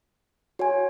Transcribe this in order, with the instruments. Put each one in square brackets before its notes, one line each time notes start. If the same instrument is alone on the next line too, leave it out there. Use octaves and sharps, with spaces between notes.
[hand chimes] F#4 C#5 G#5